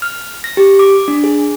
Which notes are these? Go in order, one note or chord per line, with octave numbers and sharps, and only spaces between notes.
F6
A#6
G4
D6
D4
G#4